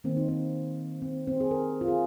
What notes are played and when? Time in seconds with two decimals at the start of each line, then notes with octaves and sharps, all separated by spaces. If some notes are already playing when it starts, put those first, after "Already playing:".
0.04 D#3 A#3 C4
0.17 D#4
0.29 C4
1.02 C4
1.27 C4
1.40 G#4
1.51 A#4
1.81 F4
1.88 G#4